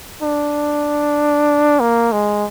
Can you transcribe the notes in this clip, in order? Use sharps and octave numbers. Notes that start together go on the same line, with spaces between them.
D4
A#3
G#3